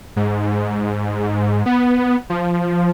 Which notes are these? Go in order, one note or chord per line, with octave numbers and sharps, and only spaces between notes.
G#2
B3
F3